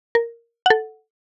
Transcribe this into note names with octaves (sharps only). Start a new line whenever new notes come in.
A#4
A4 F#5